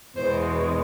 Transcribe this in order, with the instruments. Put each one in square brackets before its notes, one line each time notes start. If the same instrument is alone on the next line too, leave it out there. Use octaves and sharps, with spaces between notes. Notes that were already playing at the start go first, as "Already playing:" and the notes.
[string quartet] E2 B2 G#3 C5